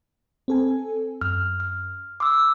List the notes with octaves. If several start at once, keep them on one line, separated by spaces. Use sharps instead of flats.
C4 A4 G#5
F#2 F6
F6
C6 D6 E6